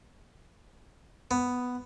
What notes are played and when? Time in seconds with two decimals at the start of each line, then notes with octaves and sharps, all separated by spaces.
1.31 B3